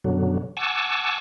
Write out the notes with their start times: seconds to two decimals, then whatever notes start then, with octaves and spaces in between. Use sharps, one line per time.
0.04 F#2 B2 D3 F#3
0.57 F#5 G#5 A5 C#6 D6 E6